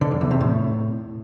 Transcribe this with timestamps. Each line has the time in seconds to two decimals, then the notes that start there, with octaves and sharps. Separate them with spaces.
0.01 D3
0.11 F#2
0.21 E2
0.31 C3
0.41 A2